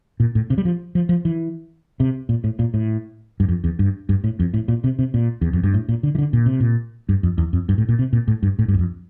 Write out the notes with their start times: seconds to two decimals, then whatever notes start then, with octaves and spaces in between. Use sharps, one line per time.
0.20 A#2
0.35 A2
0.50 C3
0.58 G3
0.65 F3
0.95 F3
1.09 F3
1.25 E3
2.00 C3
2.29 A#2
2.44 A2
2.59 A#2
2.74 A2
3.40 G2
3.48 F2
3.64 E2
3.79 G2
4.09 G2
4.24 A2
4.40 F2
4.54 A2
4.68 A#2
4.84 C3
4.99 C3
5.14 A#2
5.42 E2
5.53 F2
5.63 G2
5.74 A2
5.89 A#2
6.03 D3
6.15 E3
6.18 D3
6.33 A#2
6.46 C3
6.60 A#2
7.09 G2
7.23 F2
7.38 E2
7.53 F2
7.69 G2
7.78 A2
7.89 A#2
7.99 C3
8.13 A#2
8.28 A2
8.43 G2
8.59 A2
8.68 G2
8.74 E2
8.79 F2